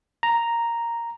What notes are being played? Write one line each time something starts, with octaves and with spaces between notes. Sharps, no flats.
A#5